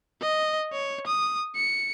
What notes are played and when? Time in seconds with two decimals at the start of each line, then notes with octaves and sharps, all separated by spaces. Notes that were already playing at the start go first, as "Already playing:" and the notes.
0.22 D#5
0.72 C#5
1.07 D#6
1.56 C#7